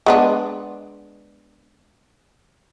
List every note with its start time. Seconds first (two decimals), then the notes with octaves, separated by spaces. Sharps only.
0.06 G#3 B3 D4